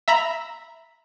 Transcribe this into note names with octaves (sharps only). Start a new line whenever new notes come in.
E5 A#5 B5